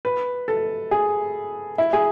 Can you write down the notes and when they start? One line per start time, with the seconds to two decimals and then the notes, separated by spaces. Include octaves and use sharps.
0.05 B4
0.48 A4
0.91 G#4
1.78 E4
1.93 G#4